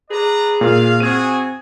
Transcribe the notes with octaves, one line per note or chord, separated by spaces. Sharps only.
G#4 B4 D5 A#5
A#2 F5
C4 F#4 G#4 G#6 D#7